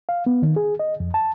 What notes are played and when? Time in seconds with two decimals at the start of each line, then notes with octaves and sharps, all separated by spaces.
0.09 F5
0.26 B3
0.42 D#3
0.56 G#4
0.79 D#5
1.00 F2
1.14 A5